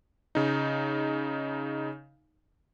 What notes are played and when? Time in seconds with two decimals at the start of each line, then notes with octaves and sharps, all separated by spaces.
0.35 C#3 D#4